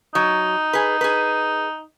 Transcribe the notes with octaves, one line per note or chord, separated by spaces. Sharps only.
F#3 D#4
G#4 B4
G#4 B4